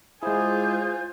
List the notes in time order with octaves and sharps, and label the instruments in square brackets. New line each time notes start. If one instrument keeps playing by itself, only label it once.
[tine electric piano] G#3 E4 [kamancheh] F4 G#5 [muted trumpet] G#4 [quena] C5